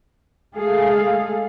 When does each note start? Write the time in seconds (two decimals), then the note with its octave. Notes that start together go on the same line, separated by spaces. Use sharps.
0.55 G#3 A3 G#4 A4 F5